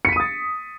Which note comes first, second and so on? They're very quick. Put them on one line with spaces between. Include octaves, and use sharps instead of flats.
C#7 B6 D#7 D#6 A6